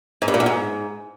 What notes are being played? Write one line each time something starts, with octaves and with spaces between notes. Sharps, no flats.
G#2
G2
A#2
E2
G#2